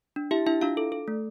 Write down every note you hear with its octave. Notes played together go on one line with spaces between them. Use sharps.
D4
E4 G4 E5
D4 E4 E5
D4 F4 F5
A4
A4
A3